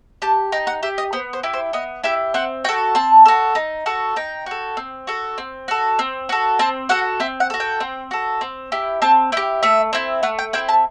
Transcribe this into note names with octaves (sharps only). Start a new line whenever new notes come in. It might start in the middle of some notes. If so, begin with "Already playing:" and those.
G4 A5
D#4 G5
F#5
G4 E5
D#5
B3 C5
C5
E4 G4
C5
B3 D#5
E4 G4 E5
C4 F#5
F#4 A4 G5
C4 A5
F#4 A4
D#4
F#4 A4
D#4 G5
F#4 A4
C4
F#4 A4
C4
F#4 A4
C4
F#4 A4
C4 A5
F#4 A4 F#5
C4 E5
F#5
F#4 A4
G5
C4
F#4 A4
C4
E4 G4
C4 A5
E4 G4 G5
A3 E5
C4 E4
A3 F#5
G5
C4 E4 G5
A5